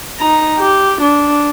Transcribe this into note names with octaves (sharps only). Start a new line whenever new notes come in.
D#4 A#5
G4
D4